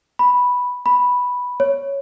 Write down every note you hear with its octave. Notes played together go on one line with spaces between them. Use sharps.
B5
B5
C#5